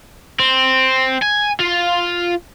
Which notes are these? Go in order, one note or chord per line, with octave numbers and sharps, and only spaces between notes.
C4
G#5
F4